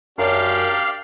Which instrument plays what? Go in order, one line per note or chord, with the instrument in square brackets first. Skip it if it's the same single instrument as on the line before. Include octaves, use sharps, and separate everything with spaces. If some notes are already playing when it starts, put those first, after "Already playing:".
[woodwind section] F#2 [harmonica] D4 G4 D5 [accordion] F5